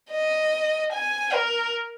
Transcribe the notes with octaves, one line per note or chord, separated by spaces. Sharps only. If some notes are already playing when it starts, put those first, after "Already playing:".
D#5
G#5
A#4